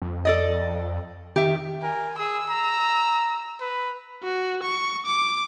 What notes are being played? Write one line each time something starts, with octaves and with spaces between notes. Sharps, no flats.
F2
A4 D5 D#5
D#3 G4 E5
A#4 G#5
G#4 E6
A#5
B4
F#4
C#6
D6